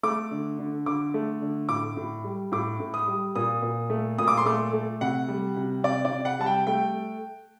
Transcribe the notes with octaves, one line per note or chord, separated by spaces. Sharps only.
A3 D6
D3
D3
D3 D6
A3
D3
A2 D6
A2
G3
A2 D6
A2
D#6
G3
A#2 D#6
A#2
A3
A#2 D#6
D6
C6
A3 D6
A3
C3 F#5
G3
C3
C3 D5
D5
C3
F#5
G3 A5
G5
A3 G5